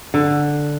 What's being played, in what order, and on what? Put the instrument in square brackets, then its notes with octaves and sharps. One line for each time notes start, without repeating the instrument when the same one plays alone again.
[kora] D3